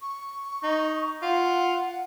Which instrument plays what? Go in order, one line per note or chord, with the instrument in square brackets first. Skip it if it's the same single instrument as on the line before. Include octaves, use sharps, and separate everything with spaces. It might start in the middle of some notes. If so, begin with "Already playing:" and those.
[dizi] C#6
[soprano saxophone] D#4
[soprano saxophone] F4 [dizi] F#5